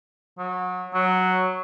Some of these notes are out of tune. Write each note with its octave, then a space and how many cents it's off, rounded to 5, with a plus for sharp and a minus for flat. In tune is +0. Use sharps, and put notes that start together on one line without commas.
F#3 -25
F#3 +0